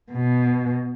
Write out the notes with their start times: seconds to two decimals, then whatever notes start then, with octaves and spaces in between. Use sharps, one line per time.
0.11 B2